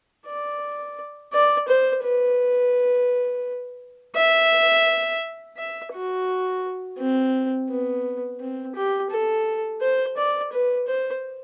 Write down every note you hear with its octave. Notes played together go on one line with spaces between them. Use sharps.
D5
D5
C5
B4
E5
E5
F#4
C4
B3
C4
G4
A4
C5
D5
B4
C5